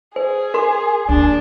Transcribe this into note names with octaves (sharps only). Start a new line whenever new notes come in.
G#4 C5
A#4 C6
D#2 D4